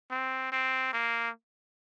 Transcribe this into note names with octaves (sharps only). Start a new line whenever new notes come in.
C4
C4
A#3